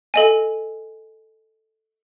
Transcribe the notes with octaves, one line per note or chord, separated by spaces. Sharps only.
A4 D#5 G#5